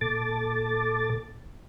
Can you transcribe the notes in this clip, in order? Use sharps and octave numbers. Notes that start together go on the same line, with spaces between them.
A#2 A4 A5 D6 A6